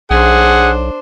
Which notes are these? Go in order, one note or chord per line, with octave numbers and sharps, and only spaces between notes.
B1 D4 G#4 C5 F#5